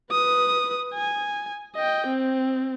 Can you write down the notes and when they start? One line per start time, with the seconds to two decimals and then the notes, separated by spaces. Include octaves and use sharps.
0.11 B4 D#6
0.94 G#5
1.75 D#5 G5
2.07 C4